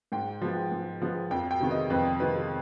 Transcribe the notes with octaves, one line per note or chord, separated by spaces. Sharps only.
G#2 G5
F3 G#3 B3
G#2
F3 G#3 B3
F2 G5
G5
C3 D#3 G#3 B3
D#5
F2 B4
C3 D#3 G#3 B3 B4